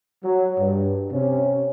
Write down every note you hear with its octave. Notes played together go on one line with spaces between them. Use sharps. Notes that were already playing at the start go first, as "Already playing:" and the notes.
F#3
G2
C3 C#4